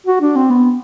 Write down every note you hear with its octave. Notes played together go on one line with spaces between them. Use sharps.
F#4
D4
C4
B3